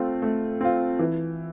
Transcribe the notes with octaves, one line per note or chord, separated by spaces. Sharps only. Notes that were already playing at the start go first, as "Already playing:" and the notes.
Already playing: A3 C4 F4
A3
C4 F4
E3